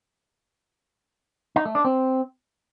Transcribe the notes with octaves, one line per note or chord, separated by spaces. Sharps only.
D#4
A3
D4
C4